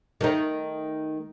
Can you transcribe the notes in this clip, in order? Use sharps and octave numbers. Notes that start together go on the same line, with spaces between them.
D#3 A3 D#4